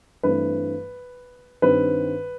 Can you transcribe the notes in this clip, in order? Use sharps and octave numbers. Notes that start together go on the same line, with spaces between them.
G2 E3 A3 C4 B4
G2 D#3 G3 C4 B4